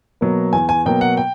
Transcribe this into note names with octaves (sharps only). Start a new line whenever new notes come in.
B2 F#3 A#3
E2 G#5
G#5
B2 F#3 A#3 G5
F#5
G5